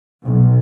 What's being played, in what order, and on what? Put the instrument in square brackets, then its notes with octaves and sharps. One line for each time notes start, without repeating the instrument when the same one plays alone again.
[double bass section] B1